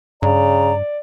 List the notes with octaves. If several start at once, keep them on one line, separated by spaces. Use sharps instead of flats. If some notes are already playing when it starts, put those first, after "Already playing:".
G2 C#3 D5 A#5